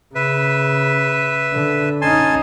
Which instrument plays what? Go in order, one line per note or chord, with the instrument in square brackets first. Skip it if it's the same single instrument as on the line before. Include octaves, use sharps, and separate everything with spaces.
[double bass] C#3 [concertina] B4 E5
[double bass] D3
[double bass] C#4 D#4 [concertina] G#5 A5 C6